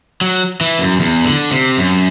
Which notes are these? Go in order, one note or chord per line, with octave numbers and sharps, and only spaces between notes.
F#3
E3
F#2
E2
D3
C3
F#2